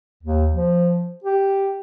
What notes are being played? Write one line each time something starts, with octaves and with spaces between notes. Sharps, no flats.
D#2
F3
G4